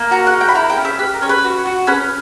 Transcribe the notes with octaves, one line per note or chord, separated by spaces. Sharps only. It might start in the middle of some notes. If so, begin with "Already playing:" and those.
Already playing: A#3
F#4 A#5
F#5
A#3
G5
B5
E4 A#5
G5
C#4
E5
G4 B4
A#4
C#4 C#5
B4
F#4
F#4
C#4 B4